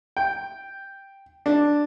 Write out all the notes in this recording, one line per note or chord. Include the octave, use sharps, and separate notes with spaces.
G5
D4